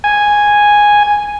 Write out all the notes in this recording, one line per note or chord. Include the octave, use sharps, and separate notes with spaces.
G#5